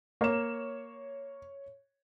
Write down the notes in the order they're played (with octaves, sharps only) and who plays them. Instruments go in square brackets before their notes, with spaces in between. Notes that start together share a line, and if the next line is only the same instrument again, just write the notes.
[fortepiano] A#3 [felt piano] C#5 E7